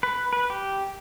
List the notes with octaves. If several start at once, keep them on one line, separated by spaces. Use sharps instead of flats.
B4
B4
G4